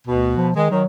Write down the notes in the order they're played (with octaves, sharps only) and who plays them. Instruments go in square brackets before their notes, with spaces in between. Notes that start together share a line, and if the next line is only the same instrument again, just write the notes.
[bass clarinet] D2 [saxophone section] B2
[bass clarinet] F3
[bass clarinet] D#3 [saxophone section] G#3
[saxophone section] D#3 [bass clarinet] F#3